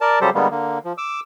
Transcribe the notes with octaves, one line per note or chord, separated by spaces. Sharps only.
A#4 D5 A5
C#3 F#3 G3 G4 A4 C5
D3 G3 G#3 A#3 B3
D3 A#3
F3
D6 E6